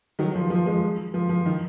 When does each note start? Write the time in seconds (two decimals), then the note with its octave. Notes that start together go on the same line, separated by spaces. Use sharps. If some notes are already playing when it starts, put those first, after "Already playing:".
0.19 D#3 F#3
0.35 F3
0.50 F3
0.66 F3 G#3
1.14 F3
1.29 F3
1.46 D#3